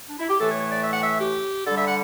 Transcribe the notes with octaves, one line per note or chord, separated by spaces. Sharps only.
D4
E4
G4
A2 E3 A3 A4
C#5
C#5
D5
E5
F#5
E5
G4
D3 G3 A4
E5
F#5